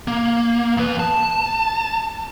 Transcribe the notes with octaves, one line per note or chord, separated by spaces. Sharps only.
A#3
E2 B4
A5